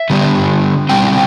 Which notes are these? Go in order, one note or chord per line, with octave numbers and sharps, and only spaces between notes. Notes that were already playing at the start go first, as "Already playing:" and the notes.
Already playing: E5
D3 G3 B3 D4
B2 G3 C4 G5